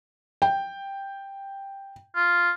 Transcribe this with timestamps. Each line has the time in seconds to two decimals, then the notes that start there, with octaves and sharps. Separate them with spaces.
0.42 G5
2.16 F4